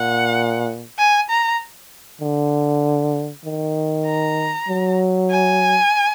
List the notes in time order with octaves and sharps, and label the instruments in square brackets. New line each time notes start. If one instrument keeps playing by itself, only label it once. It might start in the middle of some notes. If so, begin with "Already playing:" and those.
Already playing: [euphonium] A#2 [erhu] F#5
[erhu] G#5
A#5
[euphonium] D3
D#3
[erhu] A#5
[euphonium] F#3
[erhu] G#5